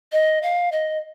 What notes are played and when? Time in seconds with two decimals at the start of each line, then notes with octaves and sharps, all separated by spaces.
0.12 D#5
0.43 F5
0.72 D#5